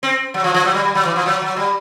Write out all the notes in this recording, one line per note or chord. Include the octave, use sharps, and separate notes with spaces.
C4
F#3
F3
F3
F#3
G3
G3
F#3
E3
F3
F#3
F#3
G3